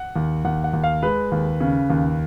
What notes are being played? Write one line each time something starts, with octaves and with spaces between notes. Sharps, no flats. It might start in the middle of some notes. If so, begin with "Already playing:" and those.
Already playing: F#5
D#2
D#2 F#5
F#5
D#2
F5
G#3 B4
D#2
C#3
D#2